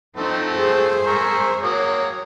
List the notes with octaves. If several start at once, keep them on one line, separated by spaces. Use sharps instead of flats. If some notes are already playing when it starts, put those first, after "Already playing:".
F3 A3 C4 D#4
G#4 C5
A#4 E5 C#6
F#3 A#3 C#5 D#6